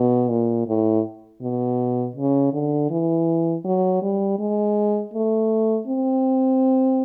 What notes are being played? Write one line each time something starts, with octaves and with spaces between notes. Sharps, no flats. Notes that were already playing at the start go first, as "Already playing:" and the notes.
Already playing: B2
A#2
A2
B2
C#3
D3
E3
F#3
G3
G#3
A3
C4